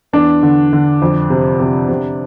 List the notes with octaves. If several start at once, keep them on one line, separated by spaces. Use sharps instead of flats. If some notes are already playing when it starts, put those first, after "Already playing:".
E2 D4
D3
D3
F2
C3
C3
C3